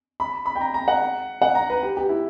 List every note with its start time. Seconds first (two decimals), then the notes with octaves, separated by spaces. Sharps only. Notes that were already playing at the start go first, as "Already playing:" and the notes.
0.20 B5
0.46 B5
0.56 G5
0.61 A#5
0.74 A#5
0.88 F#5
1.42 F#5
1.55 A#5
1.70 B4
1.83 G4
1.97 G4
2.09 E4